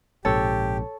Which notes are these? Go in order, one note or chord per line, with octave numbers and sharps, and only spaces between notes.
A#1 G#2 C3 G4 A4 C#5